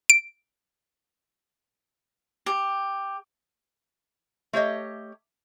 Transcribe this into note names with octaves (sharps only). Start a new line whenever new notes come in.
D7
G4
A3 G4 C#5 D#5